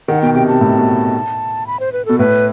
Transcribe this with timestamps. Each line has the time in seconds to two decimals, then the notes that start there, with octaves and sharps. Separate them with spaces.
0.08 D#3 F#5
0.22 B2 G5
0.34 C3 G5
0.47 C3 A5
0.61 A2
0.78 B2
1.67 B5
1.80 C5
1.93 B4
2.05 B2 A4
2.19 A2 B4